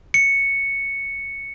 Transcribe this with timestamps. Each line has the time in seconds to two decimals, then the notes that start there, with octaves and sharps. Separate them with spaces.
0.14 C#7